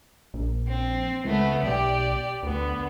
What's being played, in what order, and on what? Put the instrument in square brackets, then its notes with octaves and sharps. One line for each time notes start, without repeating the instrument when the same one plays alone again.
[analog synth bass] A#1
[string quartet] C4
[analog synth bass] C#2 [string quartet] G#3 A3 B3
[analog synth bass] B1 [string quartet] G4 D5
[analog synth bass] D2 [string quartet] D3 B3